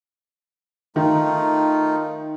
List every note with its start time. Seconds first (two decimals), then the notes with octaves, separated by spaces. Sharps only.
0.96 D#3 A3 D#4 F4